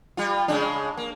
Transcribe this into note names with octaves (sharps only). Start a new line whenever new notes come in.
G3 F4
C#3 G#3 D4
A#3